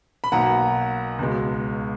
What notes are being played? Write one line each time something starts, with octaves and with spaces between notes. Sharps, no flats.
B5
B1 B2 A#3 F#5 A#5
C#2 B2 G#3